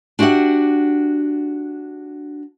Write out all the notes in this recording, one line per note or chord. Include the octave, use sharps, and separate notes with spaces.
D4 F#4 G4 E5 F#5